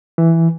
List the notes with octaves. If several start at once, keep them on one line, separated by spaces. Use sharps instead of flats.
E3